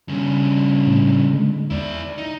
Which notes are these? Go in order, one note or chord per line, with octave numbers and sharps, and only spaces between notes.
G2 C#3
A2
D3 G#3
E2 E4 D5
D#4